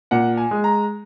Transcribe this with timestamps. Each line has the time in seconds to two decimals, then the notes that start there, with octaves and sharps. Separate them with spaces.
0.11 A#2 F#5
0.37 G#5
0.51 G#3
0.64 A#5